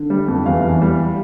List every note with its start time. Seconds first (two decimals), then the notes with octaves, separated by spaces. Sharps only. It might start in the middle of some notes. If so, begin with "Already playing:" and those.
Already playing: D3
0.10 G3
0.28 F2
0.46 E2 F5
0.64 E3
0.81 G3